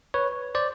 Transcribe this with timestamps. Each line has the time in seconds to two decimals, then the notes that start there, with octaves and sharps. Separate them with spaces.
0.14 B4 C#5
0.55 C5 D5